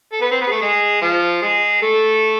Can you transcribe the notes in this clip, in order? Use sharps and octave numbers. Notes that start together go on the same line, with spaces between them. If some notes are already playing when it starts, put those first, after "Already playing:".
A4
B3 B4
C4 C5
B3 B4
G#4
A3 A4
G#3 G#4
F3 F4
G#3 G#4
A3 A4